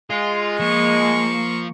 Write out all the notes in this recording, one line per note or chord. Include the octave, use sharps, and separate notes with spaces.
G#3 F4
F3 A#3 C#6